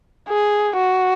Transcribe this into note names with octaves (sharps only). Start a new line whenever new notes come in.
G#4
F#4